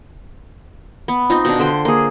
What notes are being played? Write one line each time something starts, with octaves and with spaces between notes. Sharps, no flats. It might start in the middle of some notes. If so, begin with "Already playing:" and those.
B3
C4 D#4 F4
B2 D4
D3 C5 G5
A#3 G#4